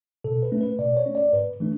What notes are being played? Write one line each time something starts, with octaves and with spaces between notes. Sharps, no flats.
B2 A4
B4
A3 C#4
B4
B2 D5
C#5
A3 C#4
D5
G#2 B4
E3 A3 D4